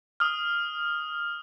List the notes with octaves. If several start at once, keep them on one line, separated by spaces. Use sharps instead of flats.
D#6 F6